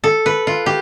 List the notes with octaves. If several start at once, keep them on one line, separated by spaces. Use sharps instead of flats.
A4
B4
F4
G4